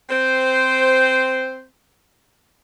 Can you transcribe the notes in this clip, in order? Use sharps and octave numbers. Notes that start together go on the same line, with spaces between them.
C4 C5